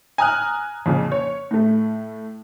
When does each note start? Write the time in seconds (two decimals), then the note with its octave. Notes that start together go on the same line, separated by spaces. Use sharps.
0.18 G#5 A#5 D#6 F6 F#6
0.86 F2 A#2 C#3
1.12 C#5
1.51 A2 A3